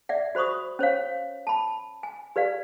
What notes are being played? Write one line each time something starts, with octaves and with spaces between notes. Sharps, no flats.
D5 E5 F#5
F#4 C5 B5 C#6 D#6
C#4 C5 C#5 F5
A5 B5
G#5
G4 B4 D5 F5